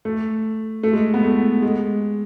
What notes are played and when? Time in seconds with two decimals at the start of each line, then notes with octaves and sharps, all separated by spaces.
0.05 A3
0.83 A3
0.93 G#3
1.14 B3
1.24 A3
1.62 G#3